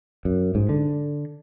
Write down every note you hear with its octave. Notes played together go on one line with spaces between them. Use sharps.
F#2
G#2
D3